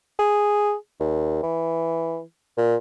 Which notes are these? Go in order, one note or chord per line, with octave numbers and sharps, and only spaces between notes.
G#4
D#2
E3
A#2